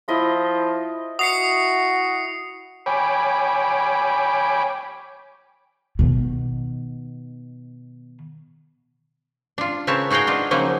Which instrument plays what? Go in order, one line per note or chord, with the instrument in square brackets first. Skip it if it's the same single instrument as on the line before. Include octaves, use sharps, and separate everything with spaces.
[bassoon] F3 [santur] E4 D#5 E5
[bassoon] F#4 [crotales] D#6 C7 C#7
[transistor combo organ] C#5 G5 G#5 B5 D6
[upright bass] B2 D#3
[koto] D4 F4
C#3 C4 A#4 B4 C#5 A5
D#4 F#4 G#4 F5 G5
D4 F4 D#5
C#3 F3 F#3 A#3 D#4